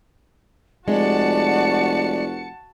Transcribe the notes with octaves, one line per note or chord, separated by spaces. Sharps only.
F1 G#3 F#4 D5 A5 C#7